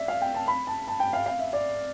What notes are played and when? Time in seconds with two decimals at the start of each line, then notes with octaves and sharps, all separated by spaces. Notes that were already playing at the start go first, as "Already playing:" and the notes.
Already playing: D5 E5
0.08 F5
0.21 G5
0.35 A5
0.47 B5
0.67 A5
0.87 A5
1.00 G5
1.13 F5
1.26 F5
1.39 E5
1.53 D5